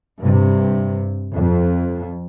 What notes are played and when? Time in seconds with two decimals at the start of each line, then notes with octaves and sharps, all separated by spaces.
0.19 G2 C3
1.34 F2